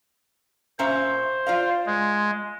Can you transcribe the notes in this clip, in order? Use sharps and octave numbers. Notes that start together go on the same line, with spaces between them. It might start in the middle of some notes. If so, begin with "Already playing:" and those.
A#2 C#4 C5 E5
F4 D5 F5
G#3